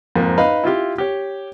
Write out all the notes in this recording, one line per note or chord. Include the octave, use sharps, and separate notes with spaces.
F2 G#2 A#3
D#4 B4 D#5 F5 B5
E4 F4 G4
G4 C#5